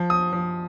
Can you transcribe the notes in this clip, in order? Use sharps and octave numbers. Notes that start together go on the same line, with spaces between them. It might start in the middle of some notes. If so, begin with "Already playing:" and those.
Already playing: F3
D#6
F3